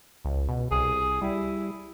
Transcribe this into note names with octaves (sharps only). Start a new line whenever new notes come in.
C#2
B2
C2 G#4
G3 E4